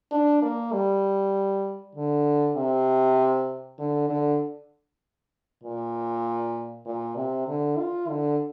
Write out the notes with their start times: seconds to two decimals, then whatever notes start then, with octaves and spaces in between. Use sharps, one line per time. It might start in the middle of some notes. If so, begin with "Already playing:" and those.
0.11 D4
0.42 A#3
0.73 G3
1.95 D3
2.57 C3
3.79 D3
4.09 D3
5.63 A#2
6.85 A#2
7.16 C3
7.48 D3
7.78 F4
8.09 D3